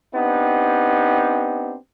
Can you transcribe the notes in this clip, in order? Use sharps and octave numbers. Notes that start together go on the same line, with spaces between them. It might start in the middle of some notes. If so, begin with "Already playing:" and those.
B3 C4 D4 D#4 G4